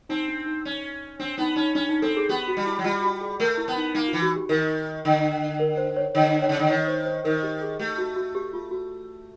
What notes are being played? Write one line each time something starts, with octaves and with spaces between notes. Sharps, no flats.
C4 D#4
D4
D#4
C#4
C4 D4
B3 D#4
C#4 D#4
C#4 D4
D#4
C4 A4
G#4
B3 G4
F#4
G3
E4
F#3
G3 F4
F#4
G#4
A3 A#4
E4
B3
D#4
A#3 D#4
E3 F4
F#4
G4
D#3 A#4
D3
A#4
C5
C#5
D3 C#5
C#5
C#3
D3
D#3 C#5
C5
C5
D#3 A#4
G4
G#4
A3 G4
F#4
F#4
G4
F4
F#4